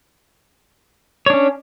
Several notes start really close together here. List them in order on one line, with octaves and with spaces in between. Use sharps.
C#5 D4 C#4